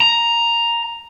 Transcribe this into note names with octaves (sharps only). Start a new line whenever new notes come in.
A#5